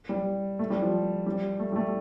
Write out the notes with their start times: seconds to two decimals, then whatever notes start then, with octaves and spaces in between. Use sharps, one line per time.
0.09 G3
0.59 A3
0.70 G3
0.82 F3
1.26 G3
1.59 A3
1.72 G3
1.76 A3